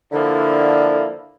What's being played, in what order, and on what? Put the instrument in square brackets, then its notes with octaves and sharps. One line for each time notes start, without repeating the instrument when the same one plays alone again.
[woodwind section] D3 [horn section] F3 A#3 E4